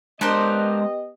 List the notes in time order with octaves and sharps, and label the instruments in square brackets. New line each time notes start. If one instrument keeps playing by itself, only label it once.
[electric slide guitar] G#3 A5 [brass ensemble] B3 G4 D#5 [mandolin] D4 A#4 C5